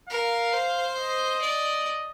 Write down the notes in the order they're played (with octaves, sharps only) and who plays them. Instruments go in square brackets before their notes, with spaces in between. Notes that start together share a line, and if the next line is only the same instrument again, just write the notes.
[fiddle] A#4 [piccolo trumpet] F5
[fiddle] C5
[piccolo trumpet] D#5
[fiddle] D5